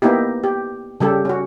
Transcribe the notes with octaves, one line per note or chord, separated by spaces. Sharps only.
A#3 B3 D#4 E4 G4
G4
C#3 G3 G4 A4
C#4 F#4